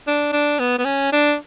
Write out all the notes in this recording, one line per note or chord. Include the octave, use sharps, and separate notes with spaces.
D4
D4
B3
B3
C#4
D4